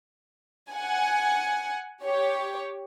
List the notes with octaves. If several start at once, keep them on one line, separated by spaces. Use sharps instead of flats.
F#5 G#5
G4 C#5